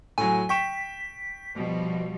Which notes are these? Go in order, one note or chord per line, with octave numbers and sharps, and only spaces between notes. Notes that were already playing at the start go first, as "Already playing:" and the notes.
A2 F#3 G#5
G5 C#6 B6 E7
B2 F3 G3